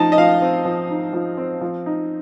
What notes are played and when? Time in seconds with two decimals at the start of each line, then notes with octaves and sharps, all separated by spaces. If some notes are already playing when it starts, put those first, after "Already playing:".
Already playing: F3 D#4 A5
0.12 D#5
0.18 F3 F5
0.42 C4
0.65 F3
0.90 D#4
1.13 F3
1.37 C4
1.61 F3
1.86 D#4